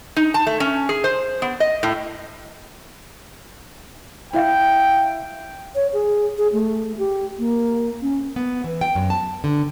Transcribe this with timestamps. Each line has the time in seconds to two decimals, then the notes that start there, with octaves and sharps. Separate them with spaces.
0.16 D#4
0.34 A5
0.47 A3
0.60 C#4
0.89 G#4
1.04 C5
1.42 B3
1.60 D#5
1.83 A2
4.33 E4 E5 F5 G5
5.75 C#5
5.93 G#4
6.38 G#4
6.53 A3
6.98 G4
7.39 A#3
8.02 C#4
8.36 B3
8.64 E3
8.81 G5
8.95 F#2
9.10 A5
9.44 D3